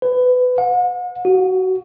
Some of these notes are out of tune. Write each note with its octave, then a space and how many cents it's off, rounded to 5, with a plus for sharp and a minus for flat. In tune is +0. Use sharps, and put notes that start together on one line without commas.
B4 +20
F#5 -45
F#4 +20